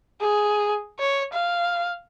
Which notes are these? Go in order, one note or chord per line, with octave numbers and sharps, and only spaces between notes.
G#4
C#5
F5